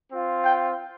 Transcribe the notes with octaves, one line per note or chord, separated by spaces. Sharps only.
C4 F4
G5